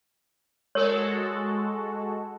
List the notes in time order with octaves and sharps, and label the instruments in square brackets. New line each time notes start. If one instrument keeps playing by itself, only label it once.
[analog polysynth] G#3 F#4 A4 [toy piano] A#4 C#5